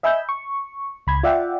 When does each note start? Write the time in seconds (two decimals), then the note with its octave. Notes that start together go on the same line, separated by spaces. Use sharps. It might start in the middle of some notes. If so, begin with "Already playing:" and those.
0.03 D#5 E5 G#5 B5 E6 G6
0.29 C#6
1.07 C#2 B5 G#6
1.23 F4 D5 E5 F#5 G5